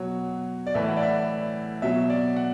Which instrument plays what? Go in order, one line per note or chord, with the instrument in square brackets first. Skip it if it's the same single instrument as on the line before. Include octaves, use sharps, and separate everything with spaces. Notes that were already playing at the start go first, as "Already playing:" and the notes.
Already playing: [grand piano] B2 F#3 C#5
D5
A2 E3 E5
F#5
D5
E5
B2 F#3 E5
D5
F#5